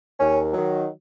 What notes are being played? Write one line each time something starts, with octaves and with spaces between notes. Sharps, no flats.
D#2 C#4
D#3 F#3